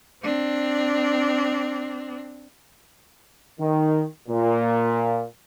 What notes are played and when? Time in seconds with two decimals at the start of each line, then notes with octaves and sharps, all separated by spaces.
0.23 C4 D4
3.60 D#3
4.28 A#2